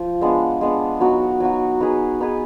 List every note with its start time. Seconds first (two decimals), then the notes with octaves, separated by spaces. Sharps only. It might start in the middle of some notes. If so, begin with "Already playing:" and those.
Already playing: F3
0.21 G#3 B3 D4
0.61 G#3 B3 D4
1.00 F#3 B3 D#4 F#4
1.40 F#3 B3 D#4 F#4
1.81 B3 D#4 G#4 B4
2.20 B3 D#4 G#4 B4